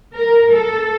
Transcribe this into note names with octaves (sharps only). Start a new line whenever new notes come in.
A#4
A4